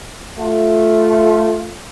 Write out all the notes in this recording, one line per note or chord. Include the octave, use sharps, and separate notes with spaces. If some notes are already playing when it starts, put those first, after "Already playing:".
A3 F4